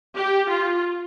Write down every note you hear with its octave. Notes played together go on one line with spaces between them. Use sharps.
G4
F4